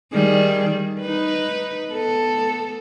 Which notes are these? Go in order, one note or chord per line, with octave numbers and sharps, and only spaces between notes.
D#3 G3 G#4
D#4 B4
B3 A4